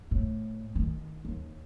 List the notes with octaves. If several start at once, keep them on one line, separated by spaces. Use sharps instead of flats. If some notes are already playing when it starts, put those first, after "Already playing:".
A2
D#3
D#2